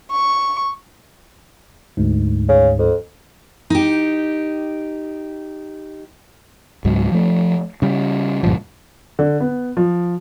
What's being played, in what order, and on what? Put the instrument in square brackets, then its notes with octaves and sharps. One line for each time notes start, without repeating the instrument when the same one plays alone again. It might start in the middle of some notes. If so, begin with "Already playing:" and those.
[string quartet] C#6
[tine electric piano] D2 G#2
[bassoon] C#3
F2
[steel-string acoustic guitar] D#4 G4
[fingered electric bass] C#2 G#2 F#3
F3 A3
C#3 G3
C#2 G2 A#2 F3
[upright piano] D3
B3
F3